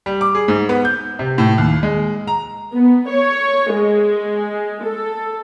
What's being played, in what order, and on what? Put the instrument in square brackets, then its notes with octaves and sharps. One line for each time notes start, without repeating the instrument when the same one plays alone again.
[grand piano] G3
D6
G#4
G#2
B3
G6
C3
A2
D#2
G#3
A#5
[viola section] B3
C#5
G#3
A4